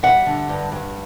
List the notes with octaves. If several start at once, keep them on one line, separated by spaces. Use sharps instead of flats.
G3 E5 F#5
D3
G2
G2